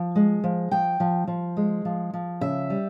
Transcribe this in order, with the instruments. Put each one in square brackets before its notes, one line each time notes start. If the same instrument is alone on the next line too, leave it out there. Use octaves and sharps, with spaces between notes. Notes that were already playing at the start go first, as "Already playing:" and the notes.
Already playing: [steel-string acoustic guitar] F3
G#3
F3
F3 G5
F3
F3
G#3
F3
F3
C#3 E5
G3